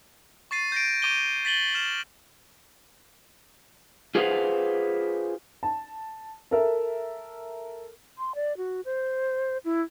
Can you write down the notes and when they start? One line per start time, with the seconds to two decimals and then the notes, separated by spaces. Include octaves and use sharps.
0.51 C#6 A6 C7 D#7
0.72 G6 A#6 D7
1.02 C#6 D6 G6 D7 D#7 G7
1.45 A6 B6 F#7 G7
1.75 F6 E7
4.15 F4 G#4 B4 C5 F5 F#5
5.63 A5
6.51 A4 A#4 E5
8.18 C6
8.35 D5
8.57 F#4
8.85 C5
9.65 E4